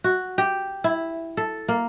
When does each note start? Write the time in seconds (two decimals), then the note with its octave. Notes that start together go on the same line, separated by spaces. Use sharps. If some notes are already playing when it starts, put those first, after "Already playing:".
0.04 F#4
0.38 G4
0.84 E4
1.37 A4
1.68 A#3